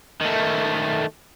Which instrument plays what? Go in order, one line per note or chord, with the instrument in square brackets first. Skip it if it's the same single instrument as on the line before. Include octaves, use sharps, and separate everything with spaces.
[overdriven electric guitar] D#3 A3